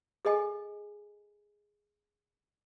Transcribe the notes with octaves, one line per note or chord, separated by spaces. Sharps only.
G#4 A4 D#5 G#5